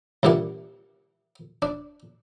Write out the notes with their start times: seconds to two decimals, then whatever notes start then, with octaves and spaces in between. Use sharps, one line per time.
0.23 C2 A#2 E3 D4 F#5
1.62 D4